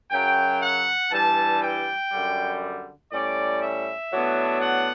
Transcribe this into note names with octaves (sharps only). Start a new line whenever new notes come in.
F#2 C#3 F#3 G5
F#5
G2 E3 G3 A5
G5
F#2 D3 G3
A2 G3 C#4 D5
E5
A2 F#3 B3 D4
F#5